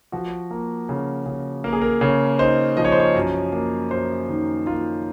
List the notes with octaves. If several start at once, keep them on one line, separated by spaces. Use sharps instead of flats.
F3 F#4
A#3
C#3
C#3
A#3 A#4
G#4
A#4
C#3
D#4 C5
F3 D#5
C#5
C5
C#5
F#2
A#3
F#2 C5
D#3
A#3 F4